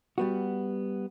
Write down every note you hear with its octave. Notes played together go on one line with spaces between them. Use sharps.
G3 B3 F#4